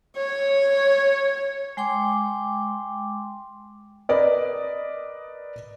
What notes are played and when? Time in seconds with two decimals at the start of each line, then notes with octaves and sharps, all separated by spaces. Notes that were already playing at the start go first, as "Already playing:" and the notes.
0.17 C#5
1.77 G#3 G5 C6 D6
4.09 A#4 B4 D5 D#5